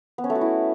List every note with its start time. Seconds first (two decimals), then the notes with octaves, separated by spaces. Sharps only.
0.18 B3
0.24 C#4
0.30 A3
0.35 F#4
0.41 E4